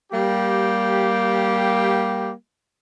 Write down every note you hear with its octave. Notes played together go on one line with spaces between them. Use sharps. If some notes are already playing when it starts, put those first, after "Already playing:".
G3 A#3 G4